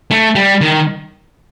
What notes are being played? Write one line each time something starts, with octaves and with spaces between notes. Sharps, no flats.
A3
G3
D#3